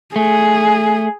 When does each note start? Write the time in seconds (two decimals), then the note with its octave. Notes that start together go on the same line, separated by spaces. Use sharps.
0.16 A3 G#4